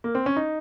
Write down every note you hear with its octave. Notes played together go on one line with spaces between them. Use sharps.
A#3
C4
C#4
D#4